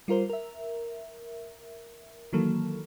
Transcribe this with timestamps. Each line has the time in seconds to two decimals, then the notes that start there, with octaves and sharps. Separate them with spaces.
0.08 G3 F4 A#4 C5
0.30 A#4 E5
2.33 D#3 E3 F#3 A#3 A4